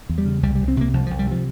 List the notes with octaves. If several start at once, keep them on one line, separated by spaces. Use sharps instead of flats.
E2
G3
C#3
C2 G3
C2 G3
C4
C3 A#3
C2 F3
C2 F3
G3
C3 F3